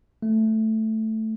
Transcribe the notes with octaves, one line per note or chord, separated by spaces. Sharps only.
A3